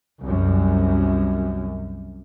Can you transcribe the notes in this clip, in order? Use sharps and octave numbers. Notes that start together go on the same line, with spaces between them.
C2 F#2